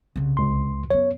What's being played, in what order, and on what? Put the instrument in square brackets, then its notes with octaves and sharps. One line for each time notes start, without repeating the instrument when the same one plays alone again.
[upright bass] C2 C#3
[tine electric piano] C#2 C6
[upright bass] F#2 B3 [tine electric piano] C#5